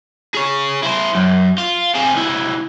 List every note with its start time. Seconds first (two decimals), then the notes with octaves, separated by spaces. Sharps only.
0.35 G#4 C#5
0.83 E4 C5
1.15 F#2
1.58 F4
1.95 C4 G#4
2.13 C#2 E3